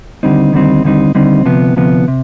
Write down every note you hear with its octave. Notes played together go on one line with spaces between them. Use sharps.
D#2 D3 G3 C4 D#4
D#2 D3 G3 C4 D#4
D#2 D3 G3 C4 D#4
D#2 D3 G3 C4 D#4
D2 C3 F3 B3
D2 C3 F3 B3
C3